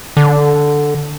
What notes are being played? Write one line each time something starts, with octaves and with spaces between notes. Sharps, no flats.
D3